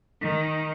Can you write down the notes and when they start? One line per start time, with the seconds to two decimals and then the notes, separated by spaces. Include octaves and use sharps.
0.21 D#3